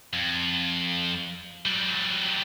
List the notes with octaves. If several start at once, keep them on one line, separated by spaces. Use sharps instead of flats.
F2
F#3 G3